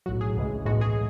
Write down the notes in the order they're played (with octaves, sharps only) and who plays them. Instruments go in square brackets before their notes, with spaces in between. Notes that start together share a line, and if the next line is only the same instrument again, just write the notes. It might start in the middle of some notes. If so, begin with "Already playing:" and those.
[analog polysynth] B1 A2 F#3 F#4
G#4
D2 C#3 E3 G#3
B1 A2 E3 G#3 F#4
G#4